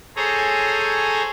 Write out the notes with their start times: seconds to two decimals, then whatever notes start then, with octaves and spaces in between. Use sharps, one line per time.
0.16 G#4 A4 C5 C#5 G#5 A#5